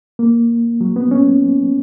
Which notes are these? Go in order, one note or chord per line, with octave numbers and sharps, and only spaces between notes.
A#3
F#3
B3
C#4